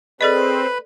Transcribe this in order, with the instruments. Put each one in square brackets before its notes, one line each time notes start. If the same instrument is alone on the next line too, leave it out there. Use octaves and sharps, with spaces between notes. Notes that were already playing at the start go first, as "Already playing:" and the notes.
[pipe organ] C4 [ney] G#4 [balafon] A4 D5 D#5 [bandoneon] B4 B5